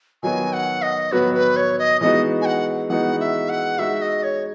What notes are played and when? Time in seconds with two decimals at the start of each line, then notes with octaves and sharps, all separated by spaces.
0.23 D#3 F#3 B3 F#4 G#5
0.53 F#5
0.82 D#5
1.12 D#3 F#3 B3 F#4 B4
1.34 B4
1.56 C#5
1.79 D#5
2.01 E3 G#3 B3 D#4 F#4 D#5
2.41 G#5
2.45 F#5
2.90 E3 G#3 B3 D#4 F#4 F#5
3.20 E5
3.49 F#5
3.79 G#3 D#4 F#4 E5
4.02 D#5
4.23 C#5